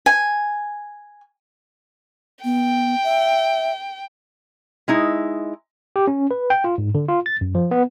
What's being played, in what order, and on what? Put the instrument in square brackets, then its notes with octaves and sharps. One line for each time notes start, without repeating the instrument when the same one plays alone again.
[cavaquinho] G#5
[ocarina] B3 [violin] G5
[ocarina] E5
[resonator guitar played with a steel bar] G#3 D#4 E4
[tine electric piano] G4
C#4
B4
G5
F4
G#2
D3
F4
A6
F#2
F3
B3